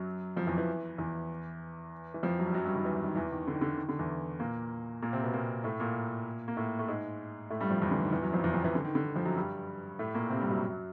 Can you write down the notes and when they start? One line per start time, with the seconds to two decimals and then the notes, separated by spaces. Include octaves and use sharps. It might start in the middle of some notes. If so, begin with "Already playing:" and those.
Already playing: F#2 F#3
0.36 F2 F3
0.47 E2 E3
0.58 E2 E3
0.98 E2 E3
2.14 E3
2.23 F2 F3
2.39 F#2 F#3
2.46 G3
2.54 F#2 F#3
2.64 G2 G3
2.75 D#3
2.85 E2 E3
3.04 D#3
3.15 E2 E3
3.31 D#3
3.47 D3
3.54 D#3
3.61 D3
3.78 D#3
3.89 D3
3.99 E2 E3
4.40 A#2 A#3
5.02 A#2 A#3
5.13 C3 C4
5.23 B2 B3
5.33 A#2 A#3
5.64 A2 A3
5.80 A#2 A#3
6.48 A#3
6.57 A2 A3
6.79 A3
6.88 G#2 G#3
7.50 A2 A3
7.61 G2 G3
7.70 F2 F3
7.82 E2 E3
7.91 D3
8.03 D#3
8.12 E2 E3
8.22 F#2 F#3
8.33 F2 F3
8.44 E2 E3
8.53 F2 F3
8.64 E2 E3
8.75 D3
8.85 D#3
8.95 D3
9.05 D#3
9.16 F2 F3
9.26 F#2 F#3
9.37 G2 G3
9.99 A2 A3
10.14 A#2 A#3
10.29 C3 C4
10.40 G2 G3
10.50 F#2 F#3